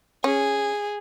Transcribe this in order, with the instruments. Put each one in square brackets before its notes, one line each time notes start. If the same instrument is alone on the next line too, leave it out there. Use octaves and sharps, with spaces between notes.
[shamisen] C#4 [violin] G#4